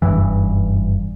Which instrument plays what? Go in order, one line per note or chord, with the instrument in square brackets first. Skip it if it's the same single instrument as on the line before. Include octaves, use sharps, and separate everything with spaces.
[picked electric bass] F#1 C#2 G2 E3